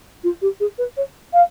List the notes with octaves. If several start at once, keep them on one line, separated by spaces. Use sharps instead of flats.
F4
G4
G#4
B4
C#5
F5